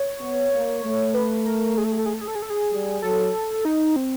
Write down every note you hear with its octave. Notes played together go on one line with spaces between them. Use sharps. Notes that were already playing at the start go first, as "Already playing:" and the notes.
Already playing: C#5
B3
A#3
A3
B4
A#4
G#4
A4
G#4
A4
G#4
A4
G#4
A4
G#4
A4
G#4
G3
F#3 A4
D#4
C4